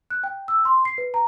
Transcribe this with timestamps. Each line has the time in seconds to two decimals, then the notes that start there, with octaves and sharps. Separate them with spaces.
0.10 F#6
0.24 G5
0.48 E6
0.65 C6
0.85 C7
0.98 B4
1.14 A#5